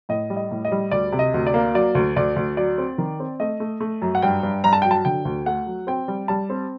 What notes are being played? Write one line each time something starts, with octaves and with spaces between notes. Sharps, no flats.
A2 D#5
G3
D#5
A2
D#5
G3
D2 D5
C3
D#5
D2
D5
A#3
F#3 D5
D2
D2 D5
D2
F#3 D5
C4
D#3
C4
A3 D#5
A3
A3
F#2
F#5
G2 G5
G2
G2 A#5
A5
F#3 G5
A5
D3 G5
D2
A3 F#5
F#3
C4 G5
G3
G3 A5
C4